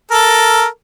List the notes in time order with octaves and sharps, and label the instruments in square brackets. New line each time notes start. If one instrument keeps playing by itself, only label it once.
[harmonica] A4 A#4